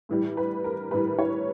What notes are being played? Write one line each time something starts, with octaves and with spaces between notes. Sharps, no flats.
A2 E3 G3
B4
A#4
A2 E3 G3 B4
C#5